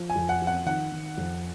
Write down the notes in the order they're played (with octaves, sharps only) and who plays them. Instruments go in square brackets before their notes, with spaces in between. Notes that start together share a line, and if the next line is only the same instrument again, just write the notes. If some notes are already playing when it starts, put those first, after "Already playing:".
Already playing: [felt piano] F3
[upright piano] G#5
[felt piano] F2
[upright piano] F#5
[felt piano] F3
[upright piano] F#5
[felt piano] D#3 [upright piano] F#5
[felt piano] D#3
F2